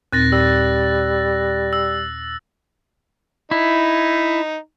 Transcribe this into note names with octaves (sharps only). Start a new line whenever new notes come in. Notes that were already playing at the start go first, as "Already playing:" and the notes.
D#2 A#2 C4 F#6 A6 A#6
G3 E6 A#6
E6
D#4 E4